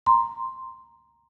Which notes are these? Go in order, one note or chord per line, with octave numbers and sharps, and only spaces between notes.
A#5 C6